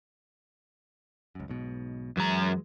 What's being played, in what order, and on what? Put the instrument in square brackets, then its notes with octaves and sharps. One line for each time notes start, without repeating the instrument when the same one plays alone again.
[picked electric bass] C#2 F#2
B1 G#2 B2
[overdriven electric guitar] F#2 A#5 [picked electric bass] E3 F#3 G#3